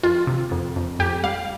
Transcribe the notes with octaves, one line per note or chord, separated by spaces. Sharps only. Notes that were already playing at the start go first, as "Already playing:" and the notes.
F2 F4
C3
F2
F2
F2 G4
G3 F5